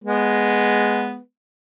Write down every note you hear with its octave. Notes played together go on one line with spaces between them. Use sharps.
G#3 B3